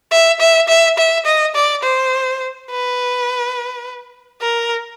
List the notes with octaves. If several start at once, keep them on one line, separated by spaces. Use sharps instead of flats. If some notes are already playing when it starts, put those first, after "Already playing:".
E5
E5
E5
E5
D#5
D5
C5
B4
A#4